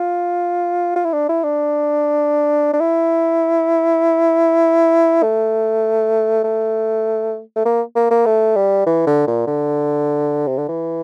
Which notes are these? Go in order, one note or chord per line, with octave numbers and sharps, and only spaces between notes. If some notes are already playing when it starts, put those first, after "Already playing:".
Already playing: F4
F4
E4
D4
E4
D4
D4
E4
A3
A3
A3
A#3
A#3
A#3
A3
G3
E3
D3
A#2
D3
C3
D3
E3